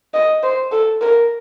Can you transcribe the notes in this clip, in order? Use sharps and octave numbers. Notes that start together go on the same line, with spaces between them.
D#5
C5
A4
A#4